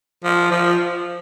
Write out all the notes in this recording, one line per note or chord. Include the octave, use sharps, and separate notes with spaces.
F3
F3